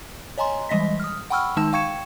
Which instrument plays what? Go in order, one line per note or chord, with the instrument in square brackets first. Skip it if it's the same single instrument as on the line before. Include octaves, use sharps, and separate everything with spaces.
[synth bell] C#5 D#5 G#5 A#5 C6
E3 G3 G#3 D#5 A#6 B6
D#6 F6
F#5 G5 B5 C#6 E6 F6
D#3 G#3 D#4 A5 E6 E7
F5 G5 C#6 G#6 C#7 E7